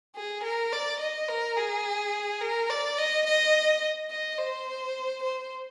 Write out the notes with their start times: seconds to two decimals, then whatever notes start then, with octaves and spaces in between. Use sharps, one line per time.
0.16 G#4
0.44 A#4
0.73 D5
1.00 D#5
1.29 A#4
1.57 G#4
2.41 A#4
2.70 D5
2.98 D#5
3.27 D#5
4.11 D#5
4.39 C5
5.23 C5